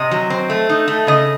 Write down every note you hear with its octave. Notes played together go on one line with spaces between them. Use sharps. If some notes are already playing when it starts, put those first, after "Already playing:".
Already playing: C3 D#5
F#3
C4
A3
D#4
A3
C#3 D#5